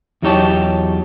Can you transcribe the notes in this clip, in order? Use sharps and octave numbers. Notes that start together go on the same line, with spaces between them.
E2 F#3 D#4 G4 C#5 A5